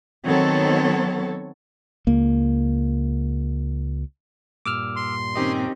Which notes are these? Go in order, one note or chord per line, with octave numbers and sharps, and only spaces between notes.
D#3 F#3 B3 C4 A4 C#5
C#2 A#3
G2 A#2 D6 E6 F6
C6
D#3 C4 C#4 D#4 G4 D#5